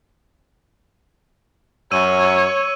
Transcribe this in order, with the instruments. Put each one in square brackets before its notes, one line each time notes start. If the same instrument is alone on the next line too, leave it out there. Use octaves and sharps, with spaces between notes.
[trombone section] F#2 [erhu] C#5 [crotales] E6 D#7